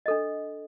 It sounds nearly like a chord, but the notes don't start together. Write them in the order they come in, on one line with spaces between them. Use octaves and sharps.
D#5 A4 D4